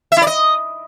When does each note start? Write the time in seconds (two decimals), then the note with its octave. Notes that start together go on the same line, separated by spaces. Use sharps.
0.12 E5
0.17 E4
0.22 D5
0.27 D#5